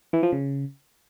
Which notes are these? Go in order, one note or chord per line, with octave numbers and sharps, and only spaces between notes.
E3
F3
C#3